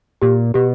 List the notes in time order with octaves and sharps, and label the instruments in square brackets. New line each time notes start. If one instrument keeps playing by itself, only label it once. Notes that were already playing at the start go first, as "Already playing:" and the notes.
[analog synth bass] A#2 [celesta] G4
[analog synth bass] B2 [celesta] G4